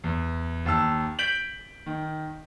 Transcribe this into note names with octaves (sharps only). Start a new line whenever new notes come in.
E2
D#2 A5 E6
G6 B6 D7 F#7
D#3